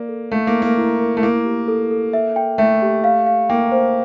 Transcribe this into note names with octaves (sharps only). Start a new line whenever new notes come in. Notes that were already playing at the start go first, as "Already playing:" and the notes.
Already playing: A#3 A#4 D5
A4
A3 F5
A#3
A#4
A#3
E4
A#4
A3
A#3 E4
G4
A4
A4
E5
G5
A3 E5
G4
F5
F5
A#3 G5
C5